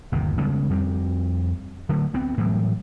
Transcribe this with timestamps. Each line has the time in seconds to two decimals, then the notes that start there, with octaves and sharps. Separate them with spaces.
0.12 G1 D#2 C3
0.38 C#3 G3 G#3 B3
0.69 F2 G3 C4
1.89 D3 F#3 A3
2.14 D2 B3 C4
2.38 A2 E3 F#3 G3